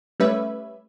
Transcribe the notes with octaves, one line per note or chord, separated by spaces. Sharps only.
G3 A3 C#4 B4 E5